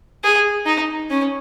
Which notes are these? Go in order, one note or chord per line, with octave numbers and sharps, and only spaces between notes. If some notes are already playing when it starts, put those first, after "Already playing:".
G#4
D#4
C#4